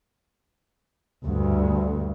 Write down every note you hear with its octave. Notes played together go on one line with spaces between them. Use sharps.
D2 G2